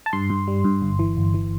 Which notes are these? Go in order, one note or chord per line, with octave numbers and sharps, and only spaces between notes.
A5
G2 C6
G2
G3
G2
G1
E3
G1
E3